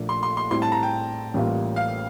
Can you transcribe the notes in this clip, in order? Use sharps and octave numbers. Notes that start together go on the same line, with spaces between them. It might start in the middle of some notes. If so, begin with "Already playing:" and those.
Already playing: A#1 A#2 A3
C6
C6
C6
A2 G3 C4 E4 C6
A5
A#5
G5
A1 A2 G3 A#3 F4
F5